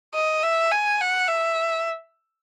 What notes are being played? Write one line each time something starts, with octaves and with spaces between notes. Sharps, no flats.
D#5
E5
G#5
F#5
E5